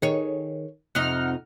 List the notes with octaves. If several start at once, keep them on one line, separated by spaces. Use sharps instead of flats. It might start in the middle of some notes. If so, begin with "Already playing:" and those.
D#3 G#4 C#5
F2 C3 D#4 F#5 F6